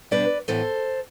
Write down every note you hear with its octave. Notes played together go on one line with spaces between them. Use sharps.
B2 G3 B3 D4 B4 D5
A2 E3 B3 A4 C5